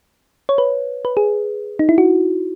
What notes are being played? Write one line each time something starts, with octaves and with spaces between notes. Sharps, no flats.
C#5
B4
B4
G#4
D#4
E4
F#4